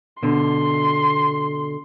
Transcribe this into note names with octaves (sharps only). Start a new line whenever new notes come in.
B2 D3 C6